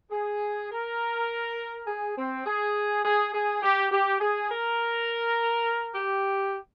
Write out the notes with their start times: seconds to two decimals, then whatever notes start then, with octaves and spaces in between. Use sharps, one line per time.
0.11 G#4
0.71 A#4
1.87 G#4
2.17 C4
2.45 G#4
3.04 G#4
3.33 G#4
3.62 G4
3.91 G4
4.21 G#4
4.50 A#4
5.95 G4